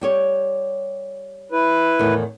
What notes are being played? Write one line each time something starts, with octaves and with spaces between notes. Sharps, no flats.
G3 G4 C#5
E4 B4
E2 A2 D#3